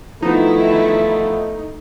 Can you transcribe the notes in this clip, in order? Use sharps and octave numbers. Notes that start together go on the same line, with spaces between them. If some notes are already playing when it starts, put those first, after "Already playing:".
D#3 F3 A3 B3 D#4 E4